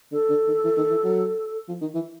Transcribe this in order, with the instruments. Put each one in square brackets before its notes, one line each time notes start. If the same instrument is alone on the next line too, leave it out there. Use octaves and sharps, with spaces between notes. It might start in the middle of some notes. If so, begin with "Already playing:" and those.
[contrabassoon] D3 [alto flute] A4
[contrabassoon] D3
D#3
E3
D#3
E3
F#3
F3
D#3
E3